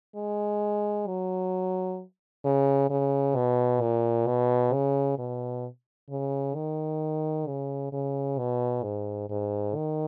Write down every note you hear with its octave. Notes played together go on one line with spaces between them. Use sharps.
G#3
F#3
C#3
C#3
B2
A#2
B2
C#3
B2
C#3
D#3
C#3
C#3
B2
G#2
G#2
D#3